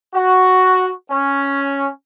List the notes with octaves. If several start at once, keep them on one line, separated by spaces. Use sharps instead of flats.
F#4
C#4